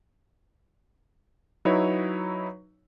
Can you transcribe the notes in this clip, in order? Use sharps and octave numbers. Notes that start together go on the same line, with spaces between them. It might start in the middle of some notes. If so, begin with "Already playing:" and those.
F#3 D#4 E4 B4 C#5